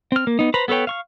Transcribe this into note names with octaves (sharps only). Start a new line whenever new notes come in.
C4 F6
A#3
B3 D#4
B4 C5 A#5 B5
B3 A4 B4 C#5 G5
F5 C#6 F6